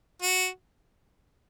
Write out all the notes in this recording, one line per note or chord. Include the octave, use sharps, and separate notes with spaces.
F#4